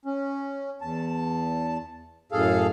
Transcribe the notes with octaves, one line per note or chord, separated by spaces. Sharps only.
C#4
E2 A5
F#2 A2 G#4 A4 F5